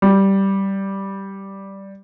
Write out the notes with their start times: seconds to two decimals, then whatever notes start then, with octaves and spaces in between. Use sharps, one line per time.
0.02 G3